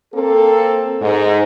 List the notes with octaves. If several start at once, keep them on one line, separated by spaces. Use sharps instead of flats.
A#3 C4 A4
G#2